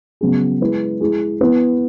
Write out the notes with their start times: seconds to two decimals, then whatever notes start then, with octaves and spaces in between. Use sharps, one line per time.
0.21 C#3 F#3 B3 G#4
0.61 G#3 E4 B4
1.01 G#3 E4 G#4
1.41 B3 E4 B4